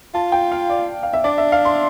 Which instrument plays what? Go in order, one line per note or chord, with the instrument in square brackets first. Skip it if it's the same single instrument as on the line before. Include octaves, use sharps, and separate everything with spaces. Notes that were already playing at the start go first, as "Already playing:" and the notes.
[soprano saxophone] F4 [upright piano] A5
[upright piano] G5
F5
D5
F5
E5
[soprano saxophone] D4 [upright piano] D5
[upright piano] E5
F5
C6